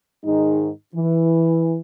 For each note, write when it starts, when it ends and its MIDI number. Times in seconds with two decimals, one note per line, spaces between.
0.25 0.70 44
0.25 0.70 51
0.25 0.70 56
0.25 0.70 63
0.95 1.78 52